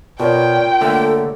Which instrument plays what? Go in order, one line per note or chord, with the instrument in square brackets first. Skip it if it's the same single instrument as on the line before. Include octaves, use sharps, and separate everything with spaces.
[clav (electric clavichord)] B2 [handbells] F4 A#4 C#5 [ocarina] D5 [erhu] G5
[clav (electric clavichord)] D3 A3 A#3 [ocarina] A4